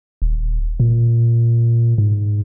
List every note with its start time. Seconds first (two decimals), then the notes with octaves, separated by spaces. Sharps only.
0.22 D#1
0.80 A#2
1.98 G#2